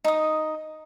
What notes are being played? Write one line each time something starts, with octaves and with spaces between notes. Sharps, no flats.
D#4 D#6